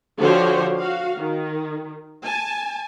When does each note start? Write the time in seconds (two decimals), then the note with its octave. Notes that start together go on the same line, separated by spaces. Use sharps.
0.19 D3 F3 F#4 G4 C5 C#5
0.78 F#4 F5
1.18 D#3
2.25 G#5 A5